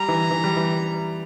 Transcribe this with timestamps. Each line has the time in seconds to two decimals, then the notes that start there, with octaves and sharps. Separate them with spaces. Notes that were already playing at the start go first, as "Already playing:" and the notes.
Already playing: G3 A#5
0.08 E3
0.31 E3
0.44 G3
0.56 E3